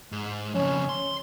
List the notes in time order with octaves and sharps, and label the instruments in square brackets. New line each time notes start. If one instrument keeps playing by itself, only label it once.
[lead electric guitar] G#2
[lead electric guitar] F2 C#3 [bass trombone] C#4
[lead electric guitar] C6